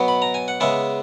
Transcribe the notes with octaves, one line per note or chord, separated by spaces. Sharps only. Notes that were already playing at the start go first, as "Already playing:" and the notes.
Already playing: B2 F#3 B3
B5
A#5
G#5
F#5
C#3 G#3 B3 E5